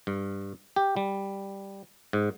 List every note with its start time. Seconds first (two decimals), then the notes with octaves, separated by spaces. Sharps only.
0.07 G2
0.76 G4
0.97 G3
2.13 G#2